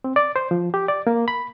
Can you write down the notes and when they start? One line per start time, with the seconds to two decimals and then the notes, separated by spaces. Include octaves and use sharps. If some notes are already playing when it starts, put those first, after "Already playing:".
0.04 C4
0.16 D5
0.36 C5
0.51 F3
0.74 G4
0.88 D5
1.07 A#3
1.28 B5